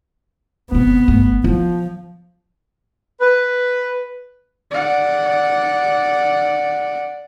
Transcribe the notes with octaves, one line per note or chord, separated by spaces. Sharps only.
F#1 C3 B3
G1 A3
F3 F4
B4
D5 F#5